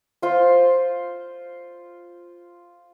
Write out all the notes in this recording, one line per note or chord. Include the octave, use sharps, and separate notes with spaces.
F4 C5